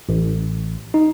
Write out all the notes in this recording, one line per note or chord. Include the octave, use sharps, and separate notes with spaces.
A1
D#4